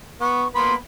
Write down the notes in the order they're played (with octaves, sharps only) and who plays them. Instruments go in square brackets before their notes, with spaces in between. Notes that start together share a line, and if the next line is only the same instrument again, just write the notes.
[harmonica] B3 F#5 [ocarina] C#6
[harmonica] A#3 B3 B5 [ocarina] C6